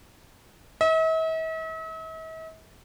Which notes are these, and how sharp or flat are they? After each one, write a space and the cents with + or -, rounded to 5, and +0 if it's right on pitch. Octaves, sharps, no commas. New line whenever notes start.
E5 -45